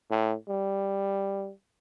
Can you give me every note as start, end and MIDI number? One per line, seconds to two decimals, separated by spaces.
0.10 0.35 45
0.48 1.51 55